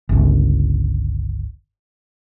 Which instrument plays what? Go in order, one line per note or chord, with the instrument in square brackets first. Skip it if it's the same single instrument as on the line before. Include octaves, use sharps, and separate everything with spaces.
[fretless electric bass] G1 C#2